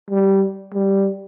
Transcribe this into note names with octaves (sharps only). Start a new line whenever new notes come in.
G3
G3